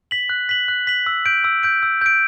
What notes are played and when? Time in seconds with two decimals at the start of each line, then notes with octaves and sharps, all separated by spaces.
0.11 B6 F#7
0.29 F#6
0.49 B6 F#7
0.68 F#6
0.87 B6 F#7
1.06 E6
1.26 G6 D7
1.44 E6
1.63 G6 D7
1.83 E6
2.01 G6 D7